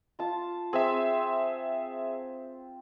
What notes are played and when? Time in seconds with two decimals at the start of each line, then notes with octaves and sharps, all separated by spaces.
0.19 F4 A5
0.73 C4 G#4 E5